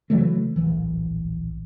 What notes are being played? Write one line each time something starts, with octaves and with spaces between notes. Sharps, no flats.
C#3 E3 F#3 A3
D1 A#1 E3